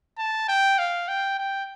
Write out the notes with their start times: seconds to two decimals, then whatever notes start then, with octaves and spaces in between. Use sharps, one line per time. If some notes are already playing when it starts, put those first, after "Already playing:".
0.18 A5
0.49 G5
0.79 F5
1.08 G5
1.39 G5